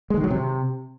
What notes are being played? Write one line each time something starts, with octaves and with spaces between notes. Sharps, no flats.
G#3
D#3
F#3
C3